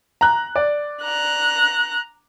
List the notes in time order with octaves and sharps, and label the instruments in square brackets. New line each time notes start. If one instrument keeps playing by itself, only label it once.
[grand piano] A#5 F#6
D5
[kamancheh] A#5 F#6